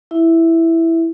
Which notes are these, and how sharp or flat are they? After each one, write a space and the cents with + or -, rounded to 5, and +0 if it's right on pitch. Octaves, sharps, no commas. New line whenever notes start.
E4 +0 E5 +0